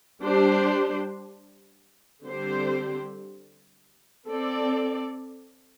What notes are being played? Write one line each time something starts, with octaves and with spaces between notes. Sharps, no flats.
G3 D4 G4 C5
D3 G3 C4 G4 C5
C4 A4 D5